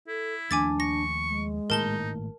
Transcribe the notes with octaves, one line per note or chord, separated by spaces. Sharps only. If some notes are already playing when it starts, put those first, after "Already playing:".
E4 A4
D#2 F3 A3 D4 G#5 D6 A6
C#6 A#6
G#3
G#1 A2 A#3 D#4 A#4 A5 G7